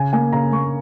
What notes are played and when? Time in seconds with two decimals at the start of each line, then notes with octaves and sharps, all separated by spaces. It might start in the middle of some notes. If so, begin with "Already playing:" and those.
Already playing: C#3 G#5
0.13 A#3 G#5
0.33 C#3 A#5
0.52 A#3 C#6